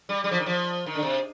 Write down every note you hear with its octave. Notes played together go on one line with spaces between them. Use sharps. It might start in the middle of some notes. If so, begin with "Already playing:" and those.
G3
G3
F3
D#3
F3
D#3
D3
C3